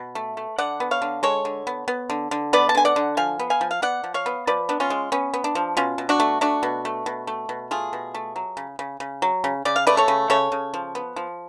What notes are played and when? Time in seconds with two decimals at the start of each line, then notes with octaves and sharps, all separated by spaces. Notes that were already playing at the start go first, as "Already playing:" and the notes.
Already playing: B2
0.15 A3
0.37 A3
0.58 D3 D5 F#5
0.80 B3
0.91 C#5 F5
1.02 D3
1.23 G#3 A4 C#5
1.45 D3
1.67 B3
1.88 B3
2.10 D3
2.31 D3
2.53 B3 B4 D5
2.69 A5
2.75 D3 G#5
2.85 D5 F#5
2.96 D3
3.17 F3 F5 G#5
3.39 B3
3.50 F5 G#5
3.61 F3
3.71 F5
3.82 B3 D5 F#5
4.04 F3
4.14 C#5 F5
4.26 B3
4.47 F3 B4 D5
4.69 B3 D4
4.80 C#4 F4
4.90 G#3
5.12 B3 C#4
5.34 B3
5.44 D4
5.55 F3
5.77 B2 C#4 F4
5.98 B2
6.09 D4 F#4
6.20 A3
6.41 A3 D4 F#4
6.63 B2
6.85 A3
7.06 B2
7.27 A3
7.49 B2
7.71 A3 F4 G#4
7.93 B2
8.14 A3
8.36 F#3
8.57 C#3
8.79 C#3
9.00 C#3
9.22 F#3
9.44 C#3
9.65 C#3 D5
9.76 F5
9.87 A3 B4 D5
9.97 A4 C#5
10.08 C#3
10.30 C#3 A4 C#5
10.52 C#3
10.74 F3
10.95 B3
11.16 F3